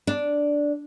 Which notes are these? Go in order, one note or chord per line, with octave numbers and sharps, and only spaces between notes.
D4